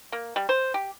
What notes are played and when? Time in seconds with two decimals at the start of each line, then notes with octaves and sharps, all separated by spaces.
0.12 A#3
0.36 G3
0.49 C5
0.74 G4